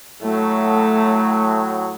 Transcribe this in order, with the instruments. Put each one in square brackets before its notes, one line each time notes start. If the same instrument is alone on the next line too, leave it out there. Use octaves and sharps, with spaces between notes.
[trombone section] A2 F#3 [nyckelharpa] A3